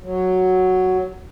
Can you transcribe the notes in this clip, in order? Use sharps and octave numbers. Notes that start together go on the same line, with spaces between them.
F#3